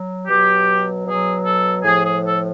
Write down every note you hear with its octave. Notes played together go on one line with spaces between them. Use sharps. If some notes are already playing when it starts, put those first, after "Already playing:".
Already playing: F#3
B2 F#3 G4
B2 F#3 G#4
A4
A2 F3 G#4
G#4
A4